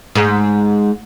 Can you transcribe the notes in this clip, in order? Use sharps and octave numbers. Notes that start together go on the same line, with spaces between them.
G#2